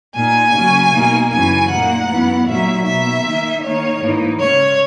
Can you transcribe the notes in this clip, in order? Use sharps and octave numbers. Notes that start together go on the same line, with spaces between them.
A#2 A#3 D#4 G#5
C#3 F#3 A#3 C#4
B2 A#3 D#4
F#2 C#3 E3 G#5
A#2 A#3 D#4 F#5
F#2 E3 B3
A#2 F#3 A#3 D#4 E5
B2 A#3 D#4 E5
D#3 A#3 D#4
D#3 A#3 D#4 C#5
G#2 E3 A#3 D#4
C#3 G#3 C#4 C#5